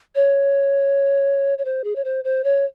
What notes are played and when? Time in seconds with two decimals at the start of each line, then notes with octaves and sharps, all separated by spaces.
0.15 C#5
1.58 C#5
1.65 C5
1.84 G#4
1.96 C#5
2.04 C5
2.24 C5
2.44 C#5